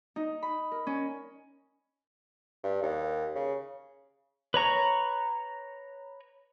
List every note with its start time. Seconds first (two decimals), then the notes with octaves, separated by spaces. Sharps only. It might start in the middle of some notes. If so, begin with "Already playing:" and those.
0.16 D#4
0.43 B5
0.71 A#4
0.87 C#4
2.63 G2
2.82 D#2
3.35 C#3
4.54 B4 C#5 A#5 C#6